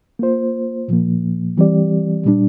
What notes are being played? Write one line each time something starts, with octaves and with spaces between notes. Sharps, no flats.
A#3 F4 C5
A#2 F3 A#3
E3 G3 C4 G4 D5
A#2 G3 D4